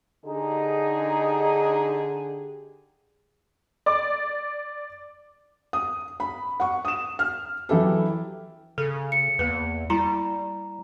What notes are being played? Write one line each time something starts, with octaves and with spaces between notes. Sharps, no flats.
D3 D#4 G4 G#4
D5 D6
D#6
B5
F#5 C#6
D#6 E7
F6
E3 F#3 E4 G4 A4
C#3 A4
C#7
E2 A#3 B4
G3 E4 A#5